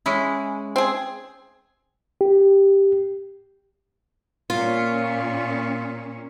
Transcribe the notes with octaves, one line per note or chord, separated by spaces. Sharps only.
G#3 C#4 E4
C4 G#4
G4
A#2 C#4 F4